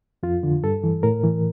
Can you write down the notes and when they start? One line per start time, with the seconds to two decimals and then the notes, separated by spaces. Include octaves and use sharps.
0.23 F2 F4
0.43 D3
0.64 G2 A4
0.84 E3
1.03 A2 A#4
1.24 E3